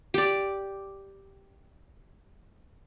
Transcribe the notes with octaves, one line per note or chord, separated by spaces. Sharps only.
G4 D5